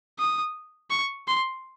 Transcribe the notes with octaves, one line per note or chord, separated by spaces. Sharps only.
D#6
C#6
C6